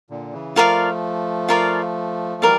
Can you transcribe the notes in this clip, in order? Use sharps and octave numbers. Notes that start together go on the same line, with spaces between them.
A#2 D3
C#3 E3
F3 A3 F4 A#4 D5 F5
F4 A#4 D5 F5
E3 G3 A#4 D5 F5